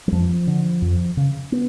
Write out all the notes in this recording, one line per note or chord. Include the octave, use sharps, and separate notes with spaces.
F#3
F2 F3
D3
F2
C#3
B3